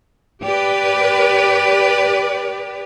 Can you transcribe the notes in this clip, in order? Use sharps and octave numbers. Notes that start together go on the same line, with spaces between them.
G4 B4 D5